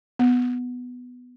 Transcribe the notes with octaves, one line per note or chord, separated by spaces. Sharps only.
B3